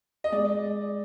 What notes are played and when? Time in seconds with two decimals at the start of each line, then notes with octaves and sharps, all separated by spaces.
0.24 D#5
0.32 G#3 D5